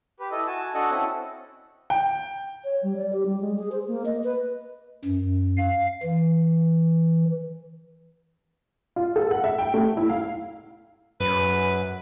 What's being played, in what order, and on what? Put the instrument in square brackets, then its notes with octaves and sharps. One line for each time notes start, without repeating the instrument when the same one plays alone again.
[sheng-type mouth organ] G4 B4
E4 A4 D#5
F#4 G#5 A5
D4 F#4 A4 D#5 F#5
C4 C#4 E4 A4
[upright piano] G5
[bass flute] C#5
G3
D5
G4
G3
G#3
G#4
C5
A#3
D#5
B4
[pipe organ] F#2
F5
E3
[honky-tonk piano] F4
A4
F#5
E5
G5
A3
E4
F5
[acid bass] F#2 [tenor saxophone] B4